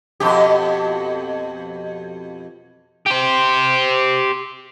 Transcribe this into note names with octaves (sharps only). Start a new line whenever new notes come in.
F2 B2 G4
G4 C5